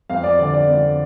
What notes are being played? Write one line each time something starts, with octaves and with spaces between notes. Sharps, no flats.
F2 F5
D5
D3 D5
D5
F2